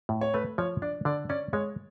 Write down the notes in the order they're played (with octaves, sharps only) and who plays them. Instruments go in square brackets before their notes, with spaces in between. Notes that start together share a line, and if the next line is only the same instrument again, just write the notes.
[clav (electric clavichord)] A2
[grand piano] C#5
[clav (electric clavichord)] A3 [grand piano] B4
[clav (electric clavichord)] F3 [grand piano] C#5
[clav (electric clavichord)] D4 [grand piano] D5
[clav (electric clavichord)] D3 [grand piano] D5
[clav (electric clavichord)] C#4 [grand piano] D5
[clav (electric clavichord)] G#3 [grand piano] C#5